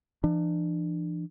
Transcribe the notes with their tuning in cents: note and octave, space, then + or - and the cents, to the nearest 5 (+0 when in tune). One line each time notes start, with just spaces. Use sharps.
E3 +40 D4 +35